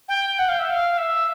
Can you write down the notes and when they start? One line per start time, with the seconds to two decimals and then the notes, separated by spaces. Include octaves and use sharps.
0.08 G5
0.38 F#5
0.48 F5
0.59 E5
0.69 F5
0.97 E5